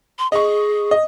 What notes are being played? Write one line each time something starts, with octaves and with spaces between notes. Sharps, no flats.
C6
G#4 D#5 C#6
D#5